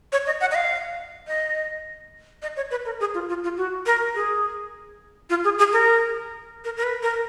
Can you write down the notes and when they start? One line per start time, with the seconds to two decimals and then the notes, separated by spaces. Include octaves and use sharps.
0.12 C#5
0.27 D#5
0.41 F#5
0.51 D#5
0.55 F5
1.27 D#5
2.42 D#5
2.57 C#5
2.71 B4
2.85 A#4
3.00 G#4
3.14 F4
3.29 F4
3.43 F4
3.57 F#4
3.86 A#4
4.15 G#4
5.30 F4
5.44 G#4
5.59 G#4
5.73 A#4
6.65 A#4
6.77 A#4
6.83 B4
7.03 A#4